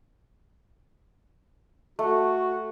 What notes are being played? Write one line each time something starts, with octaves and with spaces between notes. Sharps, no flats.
A3 F#4